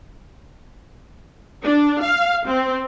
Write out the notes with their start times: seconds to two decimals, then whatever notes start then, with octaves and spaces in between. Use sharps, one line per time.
1.63 D4
2.02 F5
2.47 C4